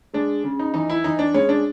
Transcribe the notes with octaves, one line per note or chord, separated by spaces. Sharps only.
G#3 D4
C#3
D#4
E3 D#4
E4
E3 D#4
D4
G#3 C#4
D4